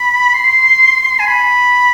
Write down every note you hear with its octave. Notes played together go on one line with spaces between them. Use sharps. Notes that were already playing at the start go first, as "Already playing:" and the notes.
Already playing: B5
C6
G#5
B5